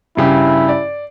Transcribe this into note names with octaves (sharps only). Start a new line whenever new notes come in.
G2 C#3 E4 G4
D5